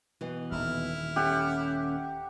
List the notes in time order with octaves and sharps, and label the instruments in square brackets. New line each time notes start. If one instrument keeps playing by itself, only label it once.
[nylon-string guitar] B2 E3
[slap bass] D#1 D#3 [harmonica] E4 F6
[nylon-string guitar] C#4 A4 E5 [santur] G4 F#5